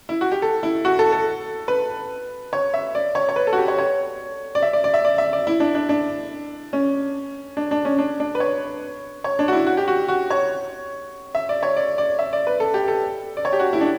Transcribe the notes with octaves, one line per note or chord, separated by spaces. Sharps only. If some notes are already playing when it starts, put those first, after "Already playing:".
E4
F#4
G4
A4
E4
F#4
A4
A4
B4
C#5
E5
D5
C#5
C#5
B4
A4
F#4
G4
C#5
C#5
D5
E5
D5
D5
E5
D5
E5
D5
E4
D4
D4
D4
C#4
D4
D4
C#4
D4
D4
B4
C#5
C#5
D4
F#4
E4
F#4
G4
F#4
F#4
C#5
E5
D5
C#5
D5
D5
E5
D5
B4
A4
G4
A4
D5
C#5
G4
F#4
E4
D4